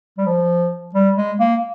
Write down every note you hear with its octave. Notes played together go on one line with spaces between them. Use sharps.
G3
F3
G3
G#3
A#3